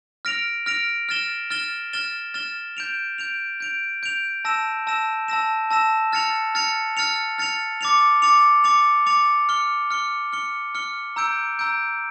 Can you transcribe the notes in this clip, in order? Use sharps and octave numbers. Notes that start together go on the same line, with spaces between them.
F6 A#6 D7 F7
F6 A#6 D7 F7
F6 A6 E7 G7
F6 A6 E7 G7
F6 A6 E7 G7
F6 A6 E7 G7
G6 D7 F7
G6 D7 F7
G6 D7 F7
G6 D7 F7
A5 E6 A#6 E7
A5 E6 A#6 E7
A5 E6 A#6 E7
A5 E6 A#6 E7
F6 A6 C#7 F7
F6 A6 C#7 F7
F6 A6 C#7 F7
F6 A6 C#7 F7
D6 A6 C#7 F7
D6 A6 C#7 F7
D6 A6 C#7 F7
D6 A6 C#7 F7
F6 C#7 G7
F6 C#7 G7
F6 C#7 G7
F6 C#7 G7
A#5 E6 G6 D7
A#5 E6 G6 D7